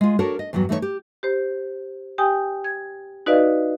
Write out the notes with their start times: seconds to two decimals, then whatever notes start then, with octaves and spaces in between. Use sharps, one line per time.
0.01 G#3 F4
0.19 D4 F#4 A4 A#4 C#5
0.39 D#5
0.53 E2 G2 F#3 B3 F#4
0.69 E3 A3 D#4 E4 C#5
0.82 G4
1.23 G4 C5
2.18 G4 G5 G#5 D#6
2.64 G#6
3.26 D#4 F#4 B4 D5 D#5 F5